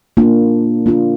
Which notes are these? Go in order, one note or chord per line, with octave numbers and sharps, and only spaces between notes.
A#3 D4 F4
A#3 D4 F4